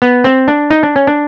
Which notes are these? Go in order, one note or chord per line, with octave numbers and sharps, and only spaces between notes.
B3
C4
D4
D#4
D4
C#4
D4